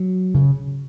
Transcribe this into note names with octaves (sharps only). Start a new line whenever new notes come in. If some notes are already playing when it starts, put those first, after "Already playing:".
Already playing: F#3
C#3